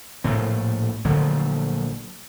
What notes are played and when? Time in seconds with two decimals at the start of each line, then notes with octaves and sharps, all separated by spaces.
0.24 A#1 A2 A3
1.05 A#1 D3 F#3 A3